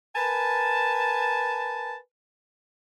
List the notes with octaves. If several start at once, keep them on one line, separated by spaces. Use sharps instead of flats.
A#4 B4 G#5 A5